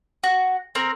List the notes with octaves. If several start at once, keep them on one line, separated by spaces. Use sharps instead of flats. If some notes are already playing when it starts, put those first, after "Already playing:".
F#4
C4 A#4